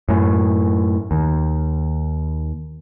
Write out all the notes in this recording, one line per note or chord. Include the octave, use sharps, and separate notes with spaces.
F#2 A2
D#2